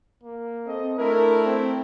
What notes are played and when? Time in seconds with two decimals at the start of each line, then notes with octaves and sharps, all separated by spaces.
0.23 A#3
0.67 C4 A4 D#5
0.99 A3 D4 E4 A#4
1.45 C4